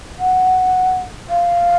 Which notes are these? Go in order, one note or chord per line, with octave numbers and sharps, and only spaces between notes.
F#5
F5